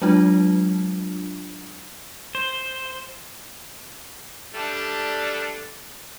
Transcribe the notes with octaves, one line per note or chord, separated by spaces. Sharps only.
F#3 G#3 D4 F4
C5
G3 A3 D4